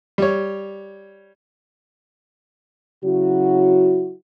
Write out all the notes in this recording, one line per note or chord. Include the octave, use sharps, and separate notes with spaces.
G3 C#5
C#3 F#3 E4 F#4